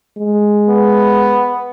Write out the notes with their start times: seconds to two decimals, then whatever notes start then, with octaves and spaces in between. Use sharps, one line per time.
0.18 G#3
0.69 B3